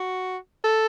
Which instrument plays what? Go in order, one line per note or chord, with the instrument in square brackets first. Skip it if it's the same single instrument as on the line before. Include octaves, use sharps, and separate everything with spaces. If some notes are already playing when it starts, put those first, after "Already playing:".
Already playing: [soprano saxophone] F#4
A4